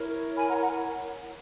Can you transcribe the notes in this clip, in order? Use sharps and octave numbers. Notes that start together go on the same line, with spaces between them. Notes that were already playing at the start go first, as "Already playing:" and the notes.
Already playing: E4 A#4 C#5
G#5 B5
F#5 A#5
F#5 A#5